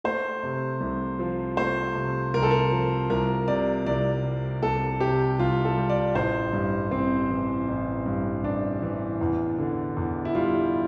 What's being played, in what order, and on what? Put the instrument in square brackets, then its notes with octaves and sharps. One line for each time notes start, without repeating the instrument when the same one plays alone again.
[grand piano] A3 C5
C3
C2
F3
A3 C5
C3
C2 A#4
A4
A#4
F3
C2 A#4
C3 D5
C2 D5
G3
C2 A4
C3 G4
C2 F4
A4
G3
D5
A1 C5
G2
A1 C4
E3
A1
G2
A1 D4
E3
E2
D3
E2
E4
G3 F4